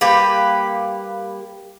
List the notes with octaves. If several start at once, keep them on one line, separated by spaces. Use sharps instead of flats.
G3 A#3 G4 B4